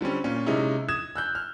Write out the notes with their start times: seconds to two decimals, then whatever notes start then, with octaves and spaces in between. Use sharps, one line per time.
0.01 D3 G3 C4 C#4
0.24 A#2 C#4
0.46 C3 G#3 C#4 D#4 E4
0.88 D#6 G#6 E7
1.16 E6 F#6 G6
1.35 F6